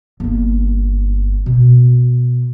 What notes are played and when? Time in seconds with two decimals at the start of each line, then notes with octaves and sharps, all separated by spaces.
0.20 G1 A#3
1.46 B2